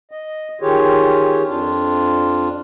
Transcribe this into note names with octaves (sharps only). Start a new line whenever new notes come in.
D#5
D#3 F4 G4 G#4 C#5
F2 D4 F4